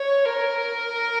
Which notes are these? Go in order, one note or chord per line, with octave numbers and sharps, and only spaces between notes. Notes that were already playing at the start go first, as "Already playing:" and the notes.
Already playing: C#5
A#4